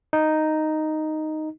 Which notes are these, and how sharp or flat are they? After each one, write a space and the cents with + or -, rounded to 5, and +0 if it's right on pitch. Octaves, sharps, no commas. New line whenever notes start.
D#4 -5